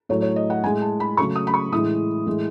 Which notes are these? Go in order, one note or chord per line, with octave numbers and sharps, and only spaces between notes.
A2 F#3 A3 C#5
C#5
D#5
F#5
A2 G#3 G#5
A5
B5
C#3 F#3 A3 C#6
D#6
B5
C#6
A2 E3 G#3 D#6
A2 E3 G#3